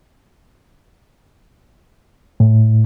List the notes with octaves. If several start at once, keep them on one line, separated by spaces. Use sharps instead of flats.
A2